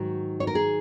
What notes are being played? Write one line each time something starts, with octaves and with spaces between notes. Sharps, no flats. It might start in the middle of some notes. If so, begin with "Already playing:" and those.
Already playing: G#2 D#3 F#3 F#4
C#5
A#4
G#4